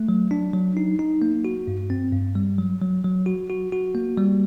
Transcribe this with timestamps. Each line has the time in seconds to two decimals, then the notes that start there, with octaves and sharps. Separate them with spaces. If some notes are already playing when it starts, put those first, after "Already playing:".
Already playing: A3
0.09 F#3
0.31 D4
0.54 F#3
0.77 D#4
0.99 D#4
1.22 A#3
1.45 F#4
1.67 G2
1.90 C4
2.13 G2
2.35 G3
2.58 F#3
2.82 F#3
3.04 F#3
3.26 F#4
3.50 F#4
3.72 F#4
3.95 A#3
4.18 G3